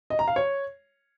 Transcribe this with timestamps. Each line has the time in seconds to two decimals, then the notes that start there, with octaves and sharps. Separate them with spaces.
0.10 D#5
0.19 A#5
0.28 F5
0.36 C#5